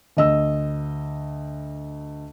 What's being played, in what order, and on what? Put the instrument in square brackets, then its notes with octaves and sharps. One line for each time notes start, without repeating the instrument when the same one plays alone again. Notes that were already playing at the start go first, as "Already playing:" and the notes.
[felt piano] D2 D#5 E6